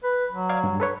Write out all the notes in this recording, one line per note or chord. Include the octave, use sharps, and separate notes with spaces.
B4
F#3
D5 F5 G#6
G2
A4 B4 C#5